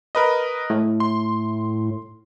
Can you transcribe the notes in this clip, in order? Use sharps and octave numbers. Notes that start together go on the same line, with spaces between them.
A#4 B4 D#5
A2
C6